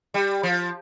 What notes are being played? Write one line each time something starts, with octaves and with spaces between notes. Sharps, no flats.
G3
F3